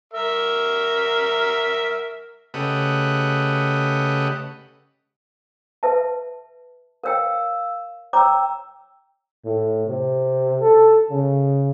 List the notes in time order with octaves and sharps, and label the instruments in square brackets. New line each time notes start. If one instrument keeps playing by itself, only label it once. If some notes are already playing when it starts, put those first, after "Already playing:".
[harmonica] A#4 E5
[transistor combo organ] C#3 A3 G4 B4 D#5 F#5
[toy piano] B4 E5 A5
[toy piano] A#4 C#5 G5 [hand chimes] F5 E6
[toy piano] C#5 A#5 D6 [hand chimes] G5 E6
[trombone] A2
C3
A4
C#3